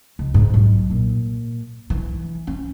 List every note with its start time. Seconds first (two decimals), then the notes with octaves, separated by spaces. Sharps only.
0.19 C#2
0.34 G#2
0.54 B1
0.90 A#2
1.90 E3
2.47 C#4